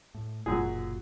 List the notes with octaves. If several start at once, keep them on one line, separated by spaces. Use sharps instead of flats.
A2
F#1 B1 F#2 A#2 F4 F#4 G#4